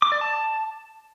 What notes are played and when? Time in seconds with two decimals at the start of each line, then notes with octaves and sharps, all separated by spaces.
0.02 D6
0.12 D5
0.21 A5